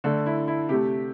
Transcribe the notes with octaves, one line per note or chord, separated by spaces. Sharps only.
D3 A3 A4
E4
E4
C3 A3 G4